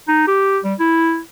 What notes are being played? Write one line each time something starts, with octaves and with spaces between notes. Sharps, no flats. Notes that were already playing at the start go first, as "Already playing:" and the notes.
D#4
G4
G3
E4